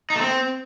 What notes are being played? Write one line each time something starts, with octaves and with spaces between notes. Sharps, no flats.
D#4
A3
C4